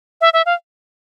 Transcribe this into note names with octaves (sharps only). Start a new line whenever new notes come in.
E5
E5
F5